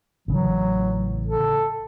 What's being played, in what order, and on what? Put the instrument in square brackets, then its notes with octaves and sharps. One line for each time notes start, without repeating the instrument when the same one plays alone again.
[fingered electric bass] A1 C#3 E3 [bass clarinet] F#3
[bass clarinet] A4